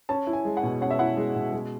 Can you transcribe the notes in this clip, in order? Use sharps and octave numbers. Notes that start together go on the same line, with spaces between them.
C#4 A5
E4
G#5
G#3
F#5
B2
C#4 F#5
E5
E4 F#5
G#3
B2
G#3